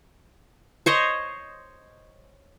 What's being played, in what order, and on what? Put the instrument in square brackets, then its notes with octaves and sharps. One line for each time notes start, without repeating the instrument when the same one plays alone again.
[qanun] C5 C#5 D#5